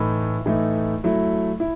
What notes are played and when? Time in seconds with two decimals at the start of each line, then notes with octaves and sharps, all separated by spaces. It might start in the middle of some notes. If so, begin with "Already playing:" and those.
Already playing: A2 E3 A3 D#4
0.46 A2 E3 A3 D#4
1.04 F#3 A3 E4
1.60 E4